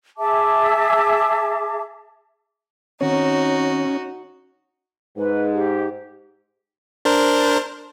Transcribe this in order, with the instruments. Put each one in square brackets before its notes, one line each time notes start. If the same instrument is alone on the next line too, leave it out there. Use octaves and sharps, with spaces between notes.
[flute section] G#4 E5 A5 D6
[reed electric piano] D#3 C4 C#5 [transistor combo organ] C#4 [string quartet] D#4 F#4
[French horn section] G#2 [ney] B4
[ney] G4
[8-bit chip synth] D4 A#4 C5